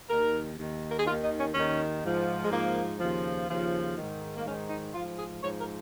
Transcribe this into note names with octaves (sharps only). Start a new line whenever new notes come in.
D#2 D#3 A#4
D#2 D#3
A#4
G#4
D#2 D#3 F4
D#4
C#4
D#2 D#3 C#4
G#2 F3
G#3
G#2 F3 A#3
D#2 C#3 F3
D#2 C#3 F3
G#2 D#3
A#3
G#2 D#3 C#4
D#4
G#2 F3 F4
G#4
G#2 F3 C#5
A#4